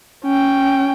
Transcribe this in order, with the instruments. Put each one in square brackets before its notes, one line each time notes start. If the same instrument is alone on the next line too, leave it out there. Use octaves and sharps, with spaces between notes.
[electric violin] C#4 G5